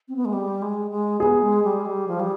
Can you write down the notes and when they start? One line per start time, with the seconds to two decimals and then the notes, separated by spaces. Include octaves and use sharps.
0.08 C4
0.16 B3
0.25 G#3
0.33 G3
0.62 G#3
0.91 G#3
1.20 B3 G#4
1.42 G#3
1.64 G3
1.80 G#3
1.86 G3
2.08 F3
2.20 G3